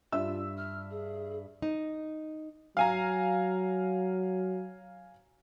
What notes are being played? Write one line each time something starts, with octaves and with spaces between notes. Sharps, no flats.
G2 F4 E5 E6
F6
G#4
D#4
F#3 F5 G#5 A#5